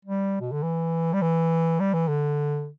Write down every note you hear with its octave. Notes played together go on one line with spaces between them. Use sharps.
G3
B2
D3
E3
G3
E3
G3
E3
D3